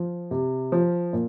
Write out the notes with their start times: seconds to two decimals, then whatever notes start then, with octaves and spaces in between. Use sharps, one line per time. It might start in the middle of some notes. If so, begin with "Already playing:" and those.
Already playing: F3
0.31 C3
0.72 F3
1.13 A#2